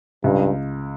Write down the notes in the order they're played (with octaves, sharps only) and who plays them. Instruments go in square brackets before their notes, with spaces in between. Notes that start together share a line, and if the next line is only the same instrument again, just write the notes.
[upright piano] C#2 [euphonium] G2